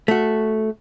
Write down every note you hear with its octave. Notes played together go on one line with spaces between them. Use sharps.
A3 F#4